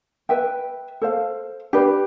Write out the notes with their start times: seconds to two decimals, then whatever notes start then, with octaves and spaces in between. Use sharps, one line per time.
0.29 B4 E5 G5
1.02 A4 C5 F5
1.73 D4 G4 B4